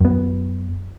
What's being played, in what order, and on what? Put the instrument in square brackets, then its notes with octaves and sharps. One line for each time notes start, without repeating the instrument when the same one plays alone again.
[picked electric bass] F#2 B3